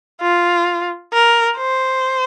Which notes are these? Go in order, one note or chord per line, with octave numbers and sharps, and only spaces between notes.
F4
A#4
C5